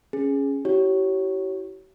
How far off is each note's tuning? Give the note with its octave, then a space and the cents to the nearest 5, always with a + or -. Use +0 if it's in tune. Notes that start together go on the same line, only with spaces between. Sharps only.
C#4 +0 G#4 +0
E4 +0 G4 -45 C#5 +0